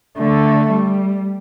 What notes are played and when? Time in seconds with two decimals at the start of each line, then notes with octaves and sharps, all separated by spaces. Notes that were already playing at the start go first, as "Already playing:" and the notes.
0.18 D3 A3
0.71 G3